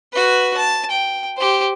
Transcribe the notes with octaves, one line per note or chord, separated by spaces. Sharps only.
F#4 B4
A5
G5
G4 C5